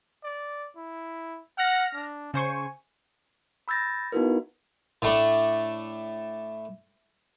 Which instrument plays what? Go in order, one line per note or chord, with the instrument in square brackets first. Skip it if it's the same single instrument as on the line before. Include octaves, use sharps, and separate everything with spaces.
[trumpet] D5
E4
[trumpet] F#5 [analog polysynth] F6 A#6
[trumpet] D4
[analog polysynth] C#3 C5 C#6 [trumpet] G#5
[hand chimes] B5 E6 G6 A6 A#6
B3 D#4 E4 F#4 A#4 B4
[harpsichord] A2 A3 D4